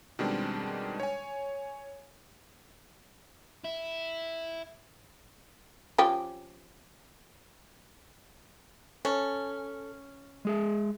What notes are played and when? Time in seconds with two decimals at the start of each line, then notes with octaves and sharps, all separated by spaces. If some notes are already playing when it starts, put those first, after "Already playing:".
0.19 B2 D#3 G3 G#3 C4 D4
1.00 C#5 G#5
3.64 E4
5.98 F3 C#4 G4
9.05 C#4 A4
10.45 G#3 G#4 E5